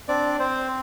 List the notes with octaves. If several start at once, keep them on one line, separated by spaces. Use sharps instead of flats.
C4 D4 D5
C4 C5